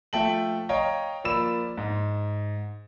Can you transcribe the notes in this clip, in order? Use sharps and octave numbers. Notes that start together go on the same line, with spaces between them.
F3 A3 E5 G5 A5 F#7
C#5 D#5 F5 G5 A#5
F3 A#3 D5 B5 E6 E7
G#2